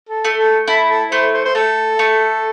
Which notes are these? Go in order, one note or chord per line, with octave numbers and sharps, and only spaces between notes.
A4
A3
A4
E4 A4
A4
A3 C5
C5
C5
A3 A4
A3